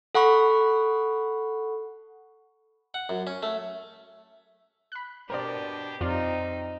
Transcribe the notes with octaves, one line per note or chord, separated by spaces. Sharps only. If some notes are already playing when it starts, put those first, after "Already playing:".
A4 F#5 B5 C#6
F#5
F#2
C#4
A3
B5 F#6
B2 D4 G4 A#4 C5 D5
F2 C4 D#4 F4 D5